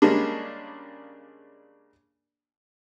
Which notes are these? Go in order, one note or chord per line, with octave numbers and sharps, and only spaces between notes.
C#3 G3 G#3 A#3 D4